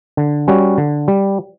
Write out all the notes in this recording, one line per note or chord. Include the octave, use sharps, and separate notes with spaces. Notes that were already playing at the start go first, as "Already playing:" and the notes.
D3
G3 C#4 F#4
D3
G3